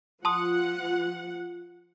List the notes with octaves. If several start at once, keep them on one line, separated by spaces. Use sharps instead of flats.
F3 F#5 A5 C6 D#6